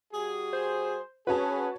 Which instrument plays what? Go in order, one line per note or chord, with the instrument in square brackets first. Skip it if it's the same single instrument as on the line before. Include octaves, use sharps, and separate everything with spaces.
[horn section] G3 F#4 G#4
[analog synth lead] C5
[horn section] C#4 G#4 [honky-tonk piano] F#4 C#5 A5 [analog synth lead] B4